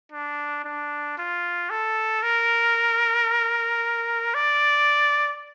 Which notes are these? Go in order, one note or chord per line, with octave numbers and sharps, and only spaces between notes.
D4
D4
F4
A4
A#4
D5